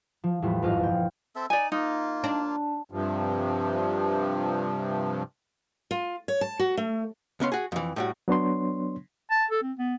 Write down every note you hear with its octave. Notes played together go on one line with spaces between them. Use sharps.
F3
E2 A2 F3 G3
G#1 F2 G#3 F4 F5
G1 A#2 G5
C4 A4 E5
D#4 D5 G#5
A#3 D#4 F4
D4
G2 C3 F3
F4
C#5
A5
F#4
A3
C#2 B3 C#4 C6
F#4 G#4
F2 E3
A2 G3 F#4
F#3 B3 D4 C#5 C6
A5
A4
C4
B3